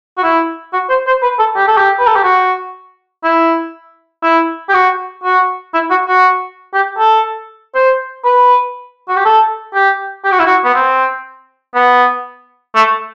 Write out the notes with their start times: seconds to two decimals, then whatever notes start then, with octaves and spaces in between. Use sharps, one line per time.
0.17 F#4
0.23 E4
0.73 F#4
0.89 C5
1.07 C5
1.22 B4
1.39 A4
1.56 G4
1.67 A4
1.77 G4
1.99 B4
2.07 A4
2.16 G4
2.23 F#4
3.24 E4
4.23 E4
4.69 G4
4.74 F#4
5.24 F#4
5.74 E4
5.90 F#4
6.07 F#4
6.74 G4
6.98 A4
7.75 C5
8.24 B4
9.09 F#4
9.16 G4
9.25 A4
9.74 G4
10.24 G4
10.32 F#4
10.39 E4
10.46 F#4
10.64 B3
10.74 C4
11.75 B3
12.75 A3